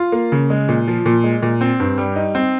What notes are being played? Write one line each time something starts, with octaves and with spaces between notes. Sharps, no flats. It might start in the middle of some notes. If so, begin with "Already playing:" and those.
Already playing: F4
A#3
C#3
G#3
A#2
F3
A#2
G#3
A#2
C4
G2
G3
D#4
C4